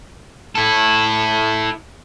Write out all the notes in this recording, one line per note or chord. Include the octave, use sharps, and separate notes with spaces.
E4 A4